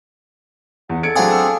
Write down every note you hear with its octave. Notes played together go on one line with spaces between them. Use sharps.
E2 F#5
A4 G#6 C#7 D7
F#3 C4 D4 G#4 F5 F#5 G#5 D#6
E6